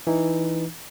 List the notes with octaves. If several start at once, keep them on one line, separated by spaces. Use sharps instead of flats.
E3 D#4